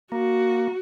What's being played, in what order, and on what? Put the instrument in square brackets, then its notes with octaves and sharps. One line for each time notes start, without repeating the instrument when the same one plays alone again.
[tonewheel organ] A#3 [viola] F#4